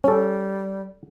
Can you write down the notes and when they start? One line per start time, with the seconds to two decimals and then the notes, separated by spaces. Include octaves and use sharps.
0.04 G3 C#4 A4